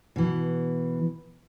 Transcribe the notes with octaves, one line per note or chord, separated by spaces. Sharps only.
B2 E3